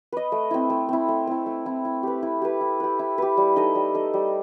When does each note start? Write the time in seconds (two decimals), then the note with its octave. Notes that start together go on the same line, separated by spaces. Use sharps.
0.12 B4 D#5
0.32 A3
0.51 C4 E4
0.70 A3
0.89 C4 E4
1.08 A3
1.27 C4 E4
1.46 A3
1.65 C4 E4
1.85 E4
2.03 G4 B4
2.23 E4
2.42 G4 B4
2.61 E4
2.80 G4 B4
2.99 E4
3.18 G4 B4
3.37 G3
3.56 D#4 A4 D#5
3.75 G3
3.94 D#4 A4 D#5
4.14 G3